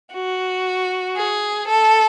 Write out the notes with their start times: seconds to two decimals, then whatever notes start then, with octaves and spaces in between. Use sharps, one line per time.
0.13 F#4
1.16 G#4
1.67 A4